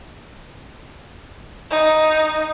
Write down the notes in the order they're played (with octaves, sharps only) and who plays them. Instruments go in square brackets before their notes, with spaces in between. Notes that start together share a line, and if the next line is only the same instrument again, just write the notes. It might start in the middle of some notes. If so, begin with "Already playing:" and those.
[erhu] D#4